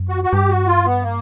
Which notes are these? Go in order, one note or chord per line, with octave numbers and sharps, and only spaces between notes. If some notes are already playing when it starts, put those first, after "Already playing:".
Already playing: F#2
F#4
F#4
G2 G4
F#4
F4
B3
A#3